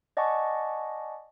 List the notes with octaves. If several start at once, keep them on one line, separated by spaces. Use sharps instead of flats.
D5 D#5 F#5 G#5 A5 C#6